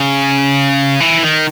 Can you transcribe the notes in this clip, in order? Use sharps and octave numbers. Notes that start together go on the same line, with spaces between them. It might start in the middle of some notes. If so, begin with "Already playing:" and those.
Already playing: C#3
E3
D#3